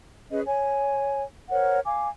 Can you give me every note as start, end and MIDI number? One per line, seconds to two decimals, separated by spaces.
0.31 0.40 61
0.31 0.40 68
0.31 0.40 71
0.31 0.40 75
0.46 1.23 73
0.46 1.23 80
1.50 1.79 70
1.50 1.79 72
1.50 1.79 73
1.50 1.79 78
1.84 2.08 77
1.84 2.08 80
1.84 2.08 86